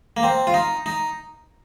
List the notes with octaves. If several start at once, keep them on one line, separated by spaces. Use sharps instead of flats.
A#3
C4
F4
D#4
D#4